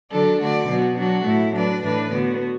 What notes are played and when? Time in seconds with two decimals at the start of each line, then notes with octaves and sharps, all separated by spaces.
0.10 D3 F#3 D4 A4 D5
0.40 D3 A3 F#4 D5
0.68 B2 F#3 B3 F#4
0.97 F#3 D4 F#4
1.26 A2 A3 E4
1.55 F#3 D4 B4 D5
1.83 A2 E3 D4 B4 D5
2.12 D3 B3 F#4